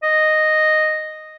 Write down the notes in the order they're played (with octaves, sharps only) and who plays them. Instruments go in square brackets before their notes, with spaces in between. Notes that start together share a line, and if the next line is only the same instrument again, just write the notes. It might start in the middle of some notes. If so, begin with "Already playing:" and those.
[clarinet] D#5